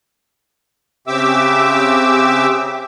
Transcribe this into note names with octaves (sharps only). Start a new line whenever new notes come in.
C#3 C4 G4 E5 D6 E6